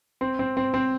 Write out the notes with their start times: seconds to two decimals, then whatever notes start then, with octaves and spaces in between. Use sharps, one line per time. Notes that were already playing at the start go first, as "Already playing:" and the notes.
0.21 C4
0.39 C4
0.57 C4
0.74 C4